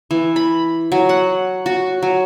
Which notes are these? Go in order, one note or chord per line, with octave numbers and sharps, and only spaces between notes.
E3
B5
F#3
F#5
F#4
F#3